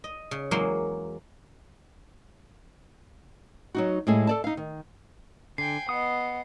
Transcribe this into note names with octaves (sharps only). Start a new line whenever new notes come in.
D#5
C#3
E2 F#3 G#3 A#3 C6
F#3 D#4 F#4
A2 G3 G#3 G#4 A4 G#5
A4 D5 A5
D#4 F5
D#3
D3 G5 G#5 C7
B3 D#5 F#5 D#6